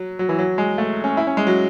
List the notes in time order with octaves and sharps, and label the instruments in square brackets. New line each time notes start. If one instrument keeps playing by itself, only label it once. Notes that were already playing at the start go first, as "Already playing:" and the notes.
Already playing: [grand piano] F#3
F#3
E3
F#3
G#3
A3
C#4
E4
C#4
G#3
F#3